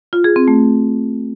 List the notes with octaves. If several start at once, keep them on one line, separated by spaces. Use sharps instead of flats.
F4
G#4
C4
A3